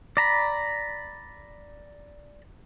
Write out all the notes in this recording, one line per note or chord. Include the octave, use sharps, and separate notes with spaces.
D5 A#5 B5